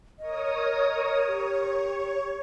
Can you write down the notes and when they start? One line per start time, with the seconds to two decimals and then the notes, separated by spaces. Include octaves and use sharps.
0.19 A#4 C#5 D#5 D#6
1.27 G4 C#5